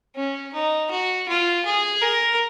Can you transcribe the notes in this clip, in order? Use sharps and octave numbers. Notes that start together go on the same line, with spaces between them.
C#4
D#4
F#4
F4
G#4
A#4